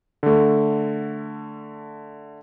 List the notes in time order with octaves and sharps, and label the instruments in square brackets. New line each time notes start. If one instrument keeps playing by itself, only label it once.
[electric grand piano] D3 A3